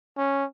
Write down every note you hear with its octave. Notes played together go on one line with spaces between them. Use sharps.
C#4